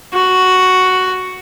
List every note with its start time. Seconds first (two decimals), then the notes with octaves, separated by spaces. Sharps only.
0.14 F#4